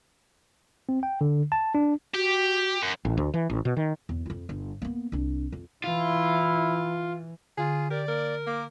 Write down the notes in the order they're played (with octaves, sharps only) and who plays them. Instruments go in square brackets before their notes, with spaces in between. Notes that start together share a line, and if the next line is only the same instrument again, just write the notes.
[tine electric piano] C4
G5
D3
A5
D4
[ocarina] F#4 [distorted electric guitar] G4
[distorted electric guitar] F#2
[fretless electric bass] A1
D2
E3
A1
B2
D#3
[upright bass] E2
F2 F4
G1
A#3 B3
C2 D4
F2
[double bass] E3 [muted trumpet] E4 [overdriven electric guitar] F4
[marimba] D3 [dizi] F4 [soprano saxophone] G#4
[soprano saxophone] G4 [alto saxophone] A#4 [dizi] D5
[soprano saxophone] A#3 [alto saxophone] A#4
[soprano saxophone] A#3 [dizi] D6